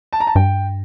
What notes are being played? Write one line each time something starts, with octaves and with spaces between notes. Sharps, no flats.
A5
A#5
A5
G2 G5